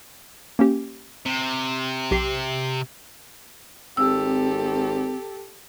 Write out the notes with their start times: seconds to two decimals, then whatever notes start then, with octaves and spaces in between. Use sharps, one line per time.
0.59 A#3 C#4 G4
1.26 C3
2.11 B1 G4 C7
3.97 G#1 C4 G4 A4 E6